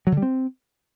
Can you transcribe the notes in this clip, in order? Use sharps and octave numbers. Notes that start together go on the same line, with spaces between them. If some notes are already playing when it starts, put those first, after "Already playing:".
F#3
D3
G3
C4